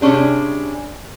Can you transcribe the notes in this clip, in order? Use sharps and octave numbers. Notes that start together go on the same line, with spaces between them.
C3 G3 C#4 D4 G#4